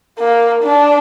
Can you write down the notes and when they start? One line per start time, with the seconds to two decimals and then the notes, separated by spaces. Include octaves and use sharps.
0.19 A#3
0.64 D4